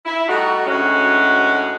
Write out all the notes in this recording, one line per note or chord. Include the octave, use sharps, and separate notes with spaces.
E4
G3 A3 D#4 F#4
D2 A2 G#3 C#4 F#4